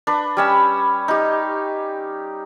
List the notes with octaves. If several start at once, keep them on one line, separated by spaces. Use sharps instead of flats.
D4 B4
G3 C#4 E6
D#4 G4